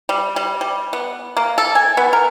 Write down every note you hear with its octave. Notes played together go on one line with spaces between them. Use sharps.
G3
G3
G3
B3
A#3
A4
G#5
B3
A#4